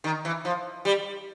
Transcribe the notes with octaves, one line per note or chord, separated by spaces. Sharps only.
D#3
E3
F3
G3